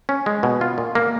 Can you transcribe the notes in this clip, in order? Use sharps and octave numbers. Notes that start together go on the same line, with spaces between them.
C#4
G#3
B2
F4
A#2
A#3